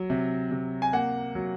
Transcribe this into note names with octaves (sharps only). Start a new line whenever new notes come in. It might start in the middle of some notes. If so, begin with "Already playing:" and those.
Already playing: F#3
C3
C3
G#5
A#3 F#5
F#3